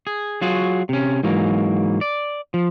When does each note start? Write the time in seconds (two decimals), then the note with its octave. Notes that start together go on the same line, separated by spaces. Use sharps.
0.07 G#4
0.42 F#3 F4 F#4 G#4
0.89 C3 C#4
1.23 G#2 E3 F#3 A#3
2.01 D5
2.54 F3